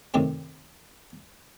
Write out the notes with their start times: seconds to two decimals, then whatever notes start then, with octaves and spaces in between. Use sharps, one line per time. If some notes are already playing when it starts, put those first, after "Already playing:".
0.14 F#2 A2 C3 D#3 C4